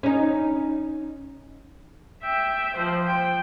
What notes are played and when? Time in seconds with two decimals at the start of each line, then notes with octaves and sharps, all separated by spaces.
0.03 C#4 D#4
2.23 E5 G5
2.76 F3 C5
3.07 G5